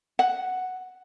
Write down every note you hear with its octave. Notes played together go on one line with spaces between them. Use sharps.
F#5